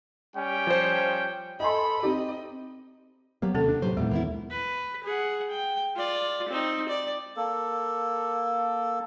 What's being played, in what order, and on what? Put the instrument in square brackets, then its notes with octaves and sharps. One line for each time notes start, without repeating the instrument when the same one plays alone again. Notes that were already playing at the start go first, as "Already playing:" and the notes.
[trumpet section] G3 C#4 G5
[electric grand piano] F3 C5
[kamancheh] A4 B5 [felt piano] D#5 G#5 C6
[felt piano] C4 D#4 G4 [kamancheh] D#5
[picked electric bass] F#3 A#3 [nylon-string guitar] B3 G4
[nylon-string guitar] D#2 [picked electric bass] C3 [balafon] A#3 C#4 A4
[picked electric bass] D4
[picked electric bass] A2 C3 F#3 [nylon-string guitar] G4 B4 C5
[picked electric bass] E2 A#2 E3 [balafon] G#3 [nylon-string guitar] B3
[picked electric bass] D#2 E3 [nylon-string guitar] A#3 B3 E4
[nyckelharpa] B4
G#4 F#5
G5
F4 D5
C4 D#4
D5
[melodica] A#3 A4